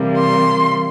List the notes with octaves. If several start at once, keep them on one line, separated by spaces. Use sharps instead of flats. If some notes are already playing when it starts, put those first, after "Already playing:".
Already playing: C3 E3 G3 A#3
C6